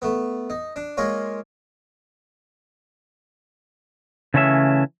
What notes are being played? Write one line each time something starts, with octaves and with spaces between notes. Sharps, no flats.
A3 B3
D#4
D4
G#3 A#3 F4 C#5
C#3 E3 A3 C#4 E5